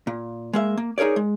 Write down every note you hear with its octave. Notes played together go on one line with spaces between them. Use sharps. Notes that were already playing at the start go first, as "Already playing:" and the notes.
A#2
G#3 A#3 E5
A#3
D#4 G#4 A#4 C#5 D5
G#3